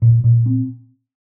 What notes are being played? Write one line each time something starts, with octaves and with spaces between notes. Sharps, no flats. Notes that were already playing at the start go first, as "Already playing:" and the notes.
A#2
A#2
C4